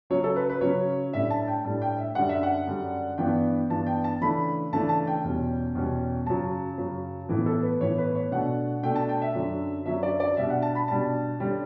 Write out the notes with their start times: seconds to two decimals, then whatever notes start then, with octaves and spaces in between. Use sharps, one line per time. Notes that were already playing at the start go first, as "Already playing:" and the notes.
0.10 C#3 F#3 C#4 C#5
0.24 A4
0.36 B4
0.49 B4
0.61 C#3 F#3 C#4 C#5
1.13 A2 G3 D4 E5
1.30 A5
1.48 G5
1.64 A2 G3 D4 A5
1.82 G5
1.98 E5
2.15 F#2 D3 G3 D4 F#5
2.29 E5
2.43 F#5
2.66 F#2 D3 G3 D4
3.18 G2 E3 B3 D4 G5
3.70 G2 E3 B3 D4 A5
3.86 G5
4.04 A5
4.21 C#3 E3 A3 D4 B5
4.73 C#3 E3 A3 D4 A5
4.89 A5
5.07 G5
5.24 E2 B2 G3 C#4
5.75 E2 B2 G3 C#4
6.26 F#2 C#3 F#3 A5
6.77 F#2 C#3 F#3
7.29 A2 E3 B3
7.46 A4
7.63 B4
7.81 A2 E3 B3 C#5
7.98 B4
8.15 C#5
8.31 B2 A3 D4 F#5
8.83 B2 A3 D4 G5
8.96 A5
9.09 G5
9.22 E5
9.34 F#2 D3 F#3
9.85 F#2 D3 F#3 E5
10.03 D5
10.20 D5
10.37 B2 G3 D4 E5
10.50 F#5
10.62 A5
10.75 B5
10.88 B2 G3 D4 A5
11.40 D3 G3 C#4